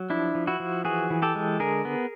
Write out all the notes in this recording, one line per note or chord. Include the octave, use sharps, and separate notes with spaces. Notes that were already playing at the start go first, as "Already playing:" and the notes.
Already playing: F#3
F3 D4 E4
F3
E4 F#4
F3
E3 F#4 G#4
E3
G4 A4
G#3
D3 G#4 A#4
B3